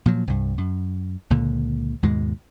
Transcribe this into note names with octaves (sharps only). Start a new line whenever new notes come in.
A#2 F3 F#3
C2 G2
F#2
C#2 A#2 D3
D#2 G#2 B2 G#3